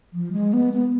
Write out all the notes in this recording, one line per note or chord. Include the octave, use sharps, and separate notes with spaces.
F3
G#3
B3
B3